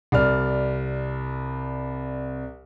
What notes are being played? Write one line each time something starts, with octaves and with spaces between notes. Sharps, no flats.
C2 D5 F6